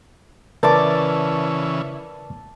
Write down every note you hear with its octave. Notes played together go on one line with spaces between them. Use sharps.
C#3 E3 A#4 B4 D5 A5 D6